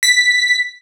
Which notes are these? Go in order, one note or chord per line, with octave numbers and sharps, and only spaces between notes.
B6